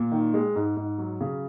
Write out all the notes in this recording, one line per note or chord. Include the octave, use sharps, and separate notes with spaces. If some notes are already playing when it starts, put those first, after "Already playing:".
Already playing: A#2
D#3
G#3
G#2
G#2
F#3
C#3